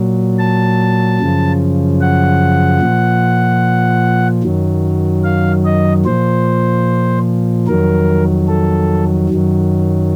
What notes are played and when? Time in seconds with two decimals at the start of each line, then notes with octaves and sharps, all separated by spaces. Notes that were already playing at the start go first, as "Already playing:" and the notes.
Already playing: A#2 F#3
0.39 A5
1.19 F#2 C#3 F3
2.01 F#5
2.81 A#2 F3
4.43 F#2 D#3 F#3
5.24 F5
5.65 D#5
6.05 A#2 F3 C5
7.67 F2 D#3 F#3 A#4
8.48 A4
9.30 F#2 D#3 F#3